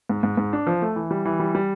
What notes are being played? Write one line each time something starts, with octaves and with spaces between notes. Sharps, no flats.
G#2
G#2
G#2
D4
F3
A3
E3
G3
E3
G3
G3